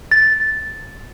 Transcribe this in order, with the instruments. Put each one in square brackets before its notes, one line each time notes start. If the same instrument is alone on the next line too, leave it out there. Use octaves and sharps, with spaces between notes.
[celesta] A6